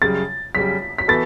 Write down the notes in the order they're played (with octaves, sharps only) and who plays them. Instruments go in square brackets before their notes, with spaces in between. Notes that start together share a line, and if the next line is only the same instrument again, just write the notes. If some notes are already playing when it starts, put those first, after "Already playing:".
[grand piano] F#2 C#3 G3 [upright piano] A6
[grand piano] F#2 C#3 G3 [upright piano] B6
[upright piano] B6
[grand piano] E3 B3 F#4 A4 [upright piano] A6